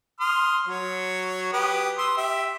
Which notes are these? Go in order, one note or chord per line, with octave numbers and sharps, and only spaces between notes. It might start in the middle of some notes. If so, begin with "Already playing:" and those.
C6 D#6 F6
F#3 C#5
G4 B4 D#6
C6 D#6 E6
G4 E5